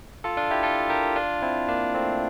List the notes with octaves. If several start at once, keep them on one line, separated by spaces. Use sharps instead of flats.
F4 A4
D4 F4
E4 G4
F4 A4
G4 A#4
D4 F4
C4 E4
A#3 D4
A3 C4